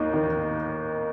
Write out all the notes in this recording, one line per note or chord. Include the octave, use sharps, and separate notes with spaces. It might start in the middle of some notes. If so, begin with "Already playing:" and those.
Already playing: D#2 A#3 D#4
D#3